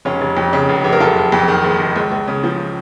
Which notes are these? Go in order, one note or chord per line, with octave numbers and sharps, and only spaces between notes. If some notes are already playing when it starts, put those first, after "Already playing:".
F1 C#4 F4
F1
F2
C#3
F1
F1
A#4
F#1 F4 A4
F#1
F2
D#3
F#1
F#1
C#2
C#2
C#3
F3